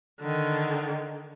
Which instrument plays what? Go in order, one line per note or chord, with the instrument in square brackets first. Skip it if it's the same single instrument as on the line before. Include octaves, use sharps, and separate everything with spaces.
[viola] D3 D#3